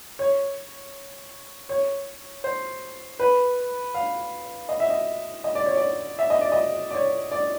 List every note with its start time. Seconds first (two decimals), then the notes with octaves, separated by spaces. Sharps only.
0.19 C#5
1.69 C#5
2.44 C5
3.19 B4
3.94 F5
4.69 D#5
4.80 E5
4.90 D#5
5.44 D#5
5.55 D5
5.66 C#5
5.77 D5
6.19 E5
6.30 D#5
6.41 D5
6.52 D#5
6.91 D5
6.94 C#5
7.31 D5